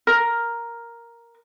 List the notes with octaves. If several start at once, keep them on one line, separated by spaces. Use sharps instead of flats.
A#4